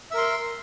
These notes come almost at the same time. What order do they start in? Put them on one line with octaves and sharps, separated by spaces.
E5 A#4 C6